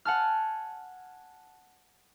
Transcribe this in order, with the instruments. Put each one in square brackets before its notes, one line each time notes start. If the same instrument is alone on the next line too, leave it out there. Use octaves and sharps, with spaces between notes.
[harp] F#5 G#5 A5 F6